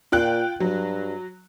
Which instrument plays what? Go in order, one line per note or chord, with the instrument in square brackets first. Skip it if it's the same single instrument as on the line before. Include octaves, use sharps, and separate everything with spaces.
[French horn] A#2 [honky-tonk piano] F4 G5 F#6
[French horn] G2 [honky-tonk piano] F#3